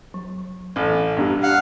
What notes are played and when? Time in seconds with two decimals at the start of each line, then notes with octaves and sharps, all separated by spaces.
0.14 F#3
0.76 A1
1.17 G2 B3 D4 G4
1.43 F5 F#5